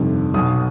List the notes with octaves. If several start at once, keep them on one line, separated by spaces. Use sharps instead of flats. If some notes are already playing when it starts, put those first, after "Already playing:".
Already playing: G1 F2 C3 D#3
B1 B2 D#6